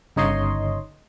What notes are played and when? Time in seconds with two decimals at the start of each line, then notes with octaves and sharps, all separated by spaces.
0.16 G1 C#3 D#4 C#5 D#5 C6